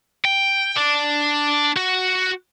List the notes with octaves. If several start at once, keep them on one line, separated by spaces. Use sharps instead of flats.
G5
D4
F#4